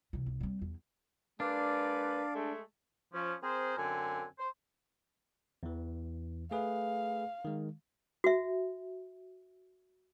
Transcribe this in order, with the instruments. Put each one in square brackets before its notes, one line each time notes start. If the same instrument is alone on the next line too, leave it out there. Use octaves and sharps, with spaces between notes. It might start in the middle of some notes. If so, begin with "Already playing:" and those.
[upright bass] C3 E3
C2
G3 C4
E2
[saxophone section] G#3 A#3 B4 [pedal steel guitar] D4 [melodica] D5 F5
[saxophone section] G#3 A3
[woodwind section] F3 C#4
C4 G#4 A#4 C5
F#2 D3 C4 G#5
C5
[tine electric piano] E2 E3
[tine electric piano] A3 G#4 B4 [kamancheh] F5
[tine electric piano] D#3 G#3
[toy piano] F#4 E5